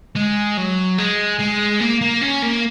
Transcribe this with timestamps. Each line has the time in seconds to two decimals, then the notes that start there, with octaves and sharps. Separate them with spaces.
0.16 G#3
0.57 F#3
0.98 G#3
1.40 G#3
1.81 A#3
2.01 A#3
2.22 C#4
2.42 A#3